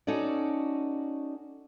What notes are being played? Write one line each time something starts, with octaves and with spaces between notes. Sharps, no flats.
C#4 D#4 F#4 A4 D5